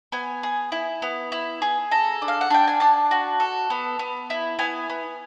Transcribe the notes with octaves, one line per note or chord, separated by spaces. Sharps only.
B3 G#5
G#4
E4
B3
E4
G#4
A4 A#5
D4
F5
F#5
D4 G5
G#5
D4 A5
F#4
A4
B3
B3
E4
B3 G#5
B3